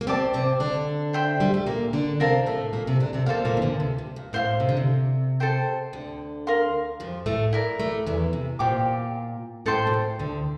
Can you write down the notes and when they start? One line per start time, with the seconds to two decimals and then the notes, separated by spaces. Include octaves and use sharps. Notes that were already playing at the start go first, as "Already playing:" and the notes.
0.01 A#3
0.07 C3 C4 G4 D5 A5 D6
0.34 C3 C4
0.60 D3 D4
1.13 C5 E5 G5 C6
1.40 G3
1.54 A3
1.67 A#2 A#3
1.93 D3 D4
2.20 C3 C4 A#4 F5 A5
2.46 A2 A3
2.73 A#2 A#3
2.87 C3 C4
3.00 D3 D4
3.13 C3 C4
3.26 A#2 A#3 A4 C5 F5
3.45 A#2 A#3
3.57 E3
3.62 D2 D3
3.80 C3
3.98 C3
4.16 A#2
4.33 A2 C5 F5 C6
4.60 C3
4.69 D3
4.77 C3
5.40 A4 C5 G5
5.93 D2 D3
6.47 A#4 F5 C6
7.00 F2 F3
7.26 A2 A3
7.53 E4 A#4 D5
7.80 A2 A3
8.07 E2 E3
8.33 C3
8.59 A#2 G4 C5 G5 D6
9.66 A2 A4 C5 G5 C6
9.87 A#2
9.93 A2
10.19 D2 D3